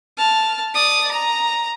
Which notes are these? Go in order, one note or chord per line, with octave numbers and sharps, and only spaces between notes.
A5 F6
D5 D#6
A#5